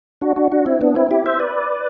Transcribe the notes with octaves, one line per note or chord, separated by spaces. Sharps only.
D4 F#4
D4 F#4
D4 F#4
C4 E4
B3 D4
C4 E4
E4 G4
C5 E5
B4 D5